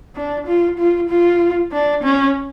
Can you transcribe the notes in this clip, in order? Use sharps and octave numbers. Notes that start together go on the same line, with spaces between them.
D4
F4
F4
F4
D4
C#4